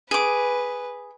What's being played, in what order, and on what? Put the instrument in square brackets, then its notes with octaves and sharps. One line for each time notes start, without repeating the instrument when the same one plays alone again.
[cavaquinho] G#4 D6 [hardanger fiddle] B4